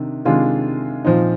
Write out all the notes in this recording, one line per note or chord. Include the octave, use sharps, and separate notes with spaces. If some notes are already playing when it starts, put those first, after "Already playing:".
Already playing: C3 D#3 D4
C3 D#3 G#3 D4 F4
A#2 F3 C4 D#4